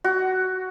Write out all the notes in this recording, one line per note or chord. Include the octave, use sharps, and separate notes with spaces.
F#4